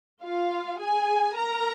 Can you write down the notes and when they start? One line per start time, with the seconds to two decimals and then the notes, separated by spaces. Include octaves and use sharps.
0.23 F4 F5
0.80 G#4 G#5
1.36 A#4 A#5